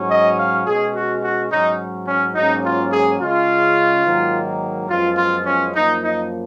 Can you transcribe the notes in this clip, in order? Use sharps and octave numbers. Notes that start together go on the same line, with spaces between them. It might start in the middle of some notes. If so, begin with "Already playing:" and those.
Already playing: G#2 F#3 C#4
D#5
F5
B2 G#3 C#4 G#4
F#4
F#4
G#2 F#3 C#4 D#4
C#4
G#2 F#3 A#3 C#4 D#4
F4
G#4
C#3 G#3 C#4 F4
G#2 D#3 F#3 A#3
F#2 F3 G#3 B3 F4
F4
C#4
F#2 F3 A#3 D#4
D#4